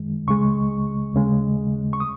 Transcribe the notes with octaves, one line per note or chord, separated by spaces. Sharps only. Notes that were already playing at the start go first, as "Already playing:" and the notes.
Already playing: F#2 D#3 G#3
C#2 C#3 G#3 C#6
D#2 C#3 G#3
C#6
D#6